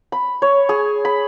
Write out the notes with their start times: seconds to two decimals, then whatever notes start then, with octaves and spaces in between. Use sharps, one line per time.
0.12 B5
0.42 C#5
0.69 G#4
1.05 B5